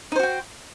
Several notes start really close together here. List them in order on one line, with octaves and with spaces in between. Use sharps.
D#4 C5 F#4 G5